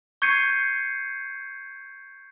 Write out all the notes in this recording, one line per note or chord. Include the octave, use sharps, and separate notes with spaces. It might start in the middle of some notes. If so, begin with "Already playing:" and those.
C#6 G6 G#6 C7 C#7 D#7